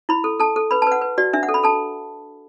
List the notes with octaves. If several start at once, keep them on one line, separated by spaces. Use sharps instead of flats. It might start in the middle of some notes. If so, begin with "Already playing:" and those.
E4 B5
A4
A4 A5
A4
B4 B5
A5
B4 F#5
B4
F#4 D5
D4 E5
F#5
A4
B5
A4 A5